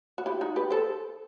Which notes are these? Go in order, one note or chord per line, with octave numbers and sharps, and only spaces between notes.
F#4
E4 G4
D#4 F#4
G4 B4
A4 C5